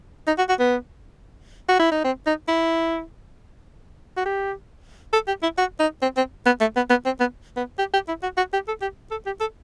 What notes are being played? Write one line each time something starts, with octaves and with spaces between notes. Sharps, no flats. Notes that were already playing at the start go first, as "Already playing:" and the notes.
D#4
F#4
F#4
B3
F#4
E4
D#4
C4
D#4
E4
F#4
G4
A4
G4
E4
F#4
D#4
C4
C4
B3
A3
B3
B3
C4
B3
B3
G4
G4
E4
F#4
F#4
G4
A4
G4
A4
G4
A4